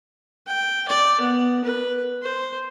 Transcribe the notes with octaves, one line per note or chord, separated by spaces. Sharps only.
G5
D5
B3
B4
C5